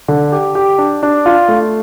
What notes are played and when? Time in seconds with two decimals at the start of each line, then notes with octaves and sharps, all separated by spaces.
0.08 D3
0.32 G4
0.55 G4
0.78 D4
1.03 D4
1.26 F4
1.48 A3